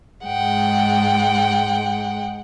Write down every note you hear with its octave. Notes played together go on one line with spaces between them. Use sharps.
G#2 G#3 F#5 G5